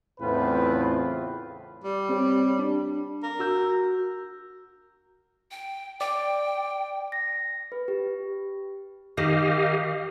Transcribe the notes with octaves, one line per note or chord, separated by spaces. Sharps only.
E2 A2 C#3 C4 F4 B4
G3
C4 G4 C#5
D4
A#4
F#4 E6 G6
G5
D5 G5
A#6
B4
G4
D#3 G4 D#5 F5